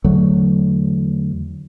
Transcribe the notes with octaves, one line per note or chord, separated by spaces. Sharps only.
E2 D3 F#3 A3